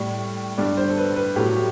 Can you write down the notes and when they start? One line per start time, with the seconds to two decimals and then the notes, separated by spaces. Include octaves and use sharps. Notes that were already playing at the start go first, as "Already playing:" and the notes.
Already playing: A2 G3
0.58 G2 D3 G3 D5
0.77 C5
0.89 A4
0.97 B4
1.16 B4
1.36 A2 F#3 A3 G4
1.56 G4